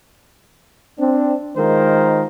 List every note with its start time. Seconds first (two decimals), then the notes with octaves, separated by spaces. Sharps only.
0.99 C4 D4
1.57 D#3 G#3 F4 A#4 C5